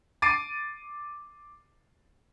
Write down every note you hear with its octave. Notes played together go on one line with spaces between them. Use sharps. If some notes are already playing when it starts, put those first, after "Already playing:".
D6 A6 C7 D7 D#7